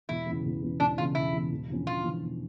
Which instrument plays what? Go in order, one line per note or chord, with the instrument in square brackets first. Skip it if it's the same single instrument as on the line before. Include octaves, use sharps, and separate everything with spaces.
[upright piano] E1 [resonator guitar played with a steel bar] E4
[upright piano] E2 C#3 E3
E1
E2 C#3 E3
[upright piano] E1 [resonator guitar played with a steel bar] D4
[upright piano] E2 C#3 E3 [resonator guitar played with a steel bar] F4
[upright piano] E1 [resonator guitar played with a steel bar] E4
[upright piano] E2 C#3 E3
E1
E2 D3 F3 C#4
[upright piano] E1 [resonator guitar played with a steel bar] F4
[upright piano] E2 D3 F3 C#4
E1